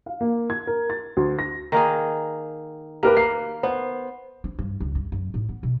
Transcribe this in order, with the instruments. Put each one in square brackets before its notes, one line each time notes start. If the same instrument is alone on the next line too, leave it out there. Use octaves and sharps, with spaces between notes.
[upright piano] F5
A#3
G#6
A#4
A6
D2
A#6
[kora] D#3 A#3 G#4
[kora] A#3 [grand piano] G4 A#4 B4
[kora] A#3 [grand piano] C7
[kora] B3 [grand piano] C5
[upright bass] D4
G2
C#2
G2
F#2
A2
B3
B2